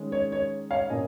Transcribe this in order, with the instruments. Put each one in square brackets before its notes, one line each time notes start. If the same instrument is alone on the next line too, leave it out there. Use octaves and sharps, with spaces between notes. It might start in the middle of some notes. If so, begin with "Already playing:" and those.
Already playing: [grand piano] D#3 G#3 C#4
C#5
C#5
C#5 F5
A#2 A#3 C#4 D#5 G#5